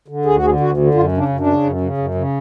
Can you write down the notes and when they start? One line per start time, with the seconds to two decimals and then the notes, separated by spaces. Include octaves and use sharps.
0.08 D3
0.25 D2 G#4
0.36 F#4
0.43 D3 G#4
0.60 D2 F#4
0.77 D3
0.94 F#2 F4
1.12 C#3
1.17 D4
1.28 F#2
1.40 D4
1.46 C#3
1.63 F#2
1.81 C#3
1.98 F#2
2.15 C#3